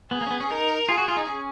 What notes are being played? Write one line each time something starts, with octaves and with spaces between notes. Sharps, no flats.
B3 G#4
A#3
C#4
B3
C#4
D#4 A#4
F4 G#4
F#4
F4
D#4
C#4